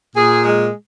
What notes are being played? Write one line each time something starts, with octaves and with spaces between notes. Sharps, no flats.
A#2 G#4
G#3